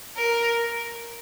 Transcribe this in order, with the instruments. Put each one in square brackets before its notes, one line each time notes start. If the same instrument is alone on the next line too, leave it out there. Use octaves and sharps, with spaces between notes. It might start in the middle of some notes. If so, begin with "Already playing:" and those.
[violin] A#4